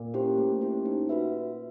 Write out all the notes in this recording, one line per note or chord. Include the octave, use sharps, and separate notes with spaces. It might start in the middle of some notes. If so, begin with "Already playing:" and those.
Already playing: A#2
C#4 E4 G4 C5
A3
C#4 E4 G4 C5
D#4
F#4 B4 E5